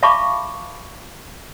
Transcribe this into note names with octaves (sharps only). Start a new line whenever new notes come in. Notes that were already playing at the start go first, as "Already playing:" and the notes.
E5 F5 A5 B5 C#6 D6